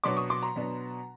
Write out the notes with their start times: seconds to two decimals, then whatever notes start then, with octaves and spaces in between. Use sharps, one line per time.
0.04 B2 F#3 B3 D4 C6 D6
0.17 C#6 D#6
0.30 C6 D6
0.43 A#5 C6
0.56 B2 F#3 B3 D4